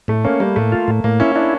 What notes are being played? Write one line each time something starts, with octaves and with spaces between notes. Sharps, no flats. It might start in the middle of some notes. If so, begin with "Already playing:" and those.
A2 A3
A#3 C#4
G3 A#3
A2 A3
F4
A2
A2 A#3
C#4 E4
D4 E4